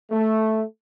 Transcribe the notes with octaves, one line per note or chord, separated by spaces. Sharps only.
A3